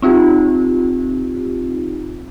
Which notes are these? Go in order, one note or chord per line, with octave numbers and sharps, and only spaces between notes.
C4 D#4 F4 G4